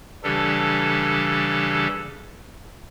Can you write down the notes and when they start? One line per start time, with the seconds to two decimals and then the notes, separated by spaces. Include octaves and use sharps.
0.24 C#3 E3 G3 D4 G4 A4